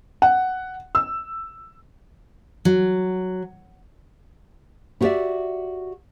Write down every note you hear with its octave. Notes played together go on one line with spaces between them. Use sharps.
F#5
E6
F#3
E4 F#4 G4 C5 D5 E5